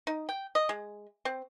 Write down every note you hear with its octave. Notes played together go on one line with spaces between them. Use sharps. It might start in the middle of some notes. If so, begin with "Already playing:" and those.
D#4
G5
D#5
G#3
C4